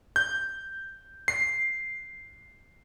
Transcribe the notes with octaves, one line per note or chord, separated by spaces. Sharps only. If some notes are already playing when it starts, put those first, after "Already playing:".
G6
C7